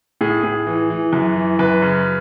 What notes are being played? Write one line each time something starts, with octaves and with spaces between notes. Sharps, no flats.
A2 G#4
A2 G#4
E3
E3
F#2
E3
F#2 B4
C#3